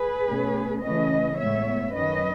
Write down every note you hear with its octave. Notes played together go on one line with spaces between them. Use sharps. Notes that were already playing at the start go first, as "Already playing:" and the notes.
Already playing: G#4 B4
B2 A3 C#4
C#3 E3 A3 C#4 B4 D#5
A2 G#3 B3 C#5 E5
F#2 D#3 F#3 C#4 B4 D#5